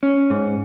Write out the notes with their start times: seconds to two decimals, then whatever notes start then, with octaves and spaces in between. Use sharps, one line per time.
0.03 C#4
0.30 G#2